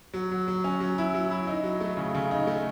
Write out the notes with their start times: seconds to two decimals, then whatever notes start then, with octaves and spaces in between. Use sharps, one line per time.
0.14 F#3
0.31 F#3
0.48 F#3
0.64 C#4
0.80 F#3
0.98 E4
1.14 F#3
1.31 E4
1.47 D#4
1.63 F#3
1.81 A3
1.97 C#3
2.15 C#3
2.31 D#4
2.47 A3